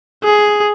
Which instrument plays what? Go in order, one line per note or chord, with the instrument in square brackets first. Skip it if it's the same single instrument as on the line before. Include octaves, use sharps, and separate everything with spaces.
[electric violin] G#4